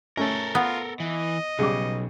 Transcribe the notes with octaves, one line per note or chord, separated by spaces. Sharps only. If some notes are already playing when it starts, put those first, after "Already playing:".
A3 C#4 A4 A#4
B3 F4
E3 D#5
B1 C#3 G3 D6